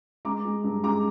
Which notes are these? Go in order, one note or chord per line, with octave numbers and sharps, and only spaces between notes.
G#3 A#5 D6
G#3
G2
G#3 A#5 D6